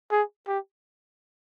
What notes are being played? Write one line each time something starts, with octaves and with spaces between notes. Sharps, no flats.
G#4
G4